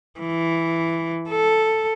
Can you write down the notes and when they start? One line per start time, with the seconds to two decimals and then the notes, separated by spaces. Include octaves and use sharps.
0.20 E3
1.30 A4